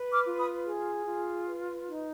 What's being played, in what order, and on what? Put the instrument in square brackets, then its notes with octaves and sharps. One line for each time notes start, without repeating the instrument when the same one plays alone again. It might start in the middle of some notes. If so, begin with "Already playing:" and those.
Already playing: [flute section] B4
D6 F6
F4
B5 D#6
G#4
F4
B4
D#4